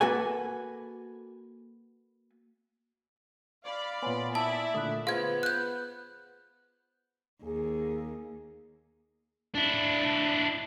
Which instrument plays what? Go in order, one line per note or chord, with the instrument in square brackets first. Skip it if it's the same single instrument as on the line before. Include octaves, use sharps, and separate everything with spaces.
[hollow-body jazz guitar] A#3 F#4 A4 B4 G#5
[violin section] D5 F5 B5
[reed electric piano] A#2 B3 [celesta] C#5 G#5 C6
[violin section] E4 D5 E5 [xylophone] A5 [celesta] D#6 E6 F#7
[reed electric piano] A#2 D3 A3 [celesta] D#6 F#6
[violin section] B3 [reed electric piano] F4 [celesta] G#4 C5 F#5 [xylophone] F5 G#6
[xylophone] F#6 G6
[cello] D#2 [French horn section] G#4
[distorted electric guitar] D4 E4